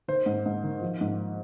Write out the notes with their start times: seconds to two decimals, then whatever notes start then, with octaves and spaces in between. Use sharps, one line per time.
0.08 D#3 C5
0.26 G#2
0.46 G#2
0.64 D#3
0.82 F3
1.01 G#2